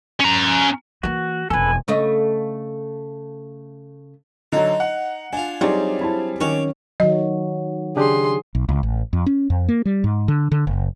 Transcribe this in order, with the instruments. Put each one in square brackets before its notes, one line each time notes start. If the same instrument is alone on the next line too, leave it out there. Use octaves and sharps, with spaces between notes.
[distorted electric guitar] C#4 A#5
[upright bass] E3 A#3 [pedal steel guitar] F#4
[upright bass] E1 F2 [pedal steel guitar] A4 B4 [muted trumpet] G#5
[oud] C#3 A3 D#5
[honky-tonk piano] D3 F#3 [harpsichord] D#4
[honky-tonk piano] F#5
[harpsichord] D4 F4 [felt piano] G#5
[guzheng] F#3 C4 [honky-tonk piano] G3 G#4 [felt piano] D#4 D5
[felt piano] E4 C5 A5
[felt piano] D#3 [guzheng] C#4 F#4 [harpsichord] C#5 D6
[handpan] D#3 F#3 [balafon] D#5
[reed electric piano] C#3 D4 G4 [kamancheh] G#4 C6
[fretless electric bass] B1
C#2
A1
F2
C#4
F2
A#3
G3
G#2
D3
D3
F#1